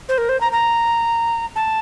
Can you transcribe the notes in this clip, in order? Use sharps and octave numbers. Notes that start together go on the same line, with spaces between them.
C5
A#4
C5
A#5
A#5
A5